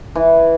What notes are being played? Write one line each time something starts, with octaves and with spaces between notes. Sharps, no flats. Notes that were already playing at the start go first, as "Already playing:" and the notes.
E3